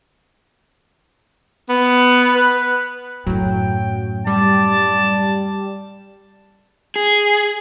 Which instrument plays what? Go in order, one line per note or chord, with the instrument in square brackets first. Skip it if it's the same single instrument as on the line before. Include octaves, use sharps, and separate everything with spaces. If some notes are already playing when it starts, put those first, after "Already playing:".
[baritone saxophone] B3
[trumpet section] B4
[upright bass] F#2 A2 [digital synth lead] F#3 [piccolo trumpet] G5
[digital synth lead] G3 [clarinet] D5 [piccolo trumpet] A5
[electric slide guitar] G#4